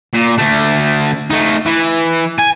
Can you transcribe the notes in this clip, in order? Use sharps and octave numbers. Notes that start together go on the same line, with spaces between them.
A#2
D3 A3
A3 D#4
E3
G#5